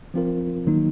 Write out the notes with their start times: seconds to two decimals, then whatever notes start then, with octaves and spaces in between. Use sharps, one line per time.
0.14 F3 C4 F4 A#4
0.67 D#3 F#3 A#3 D#4